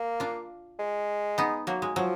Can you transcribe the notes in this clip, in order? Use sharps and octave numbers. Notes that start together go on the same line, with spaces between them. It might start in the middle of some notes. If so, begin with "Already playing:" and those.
Already playing: A#3
D4 F4
G#3
B3 D#4
F#3 A#3
G#3
F3 F#3